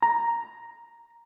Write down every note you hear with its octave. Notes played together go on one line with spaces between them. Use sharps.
A#5